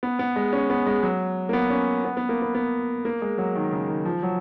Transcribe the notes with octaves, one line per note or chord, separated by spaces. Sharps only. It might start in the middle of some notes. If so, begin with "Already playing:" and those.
B3
B3
G#3
C#4
B3
G#3
F#3
A#3
B3
C#4
B3
B3
A#3
B3
B3
A#3
G#3
F#3
D#3
C#3
D#3
F3
F#3